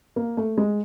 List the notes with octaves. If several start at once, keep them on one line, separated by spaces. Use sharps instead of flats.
A#3
A3
G#3